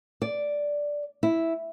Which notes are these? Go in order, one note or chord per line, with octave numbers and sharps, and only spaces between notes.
D5
E4